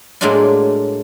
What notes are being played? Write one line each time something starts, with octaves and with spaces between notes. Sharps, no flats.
A2 F#3 G#3 A#3 D4 F4